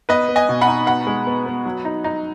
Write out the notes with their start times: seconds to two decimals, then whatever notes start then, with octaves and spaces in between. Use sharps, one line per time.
0.09 B3 B4 D#5
0.29 B3
0.36 D#5 G#5
0.49 B2
0.61 F#5 B5
0.68 D#4
0.87 B2 F#5 B5
1.07 G#3
1.27 B3
1.46 B3
1.65 F#3
1.85 D#4
2.04 D#4